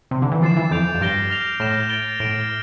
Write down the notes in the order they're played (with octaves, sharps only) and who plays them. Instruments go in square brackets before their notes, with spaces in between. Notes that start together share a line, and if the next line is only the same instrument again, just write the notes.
[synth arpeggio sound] C3
D3
E3
[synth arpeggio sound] F3 [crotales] D6 A6 C7 E7
[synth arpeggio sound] E3
[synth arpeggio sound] F2 [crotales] G6 D7 F7
[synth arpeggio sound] F2
[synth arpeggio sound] G2 [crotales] F6 A#6 D7 G7
[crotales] F6 A#6 F7
[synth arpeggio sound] A2 [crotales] F6 A#6 E7
[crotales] A6 D7 G7
[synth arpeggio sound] A2 [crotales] A6 D7 G7